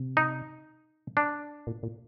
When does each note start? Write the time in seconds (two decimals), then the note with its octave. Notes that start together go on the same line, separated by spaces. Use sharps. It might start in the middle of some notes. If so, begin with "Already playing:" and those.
Already playing: C3
0.17 D#4
1.17 D4
1.67 A#2
1.83 A#2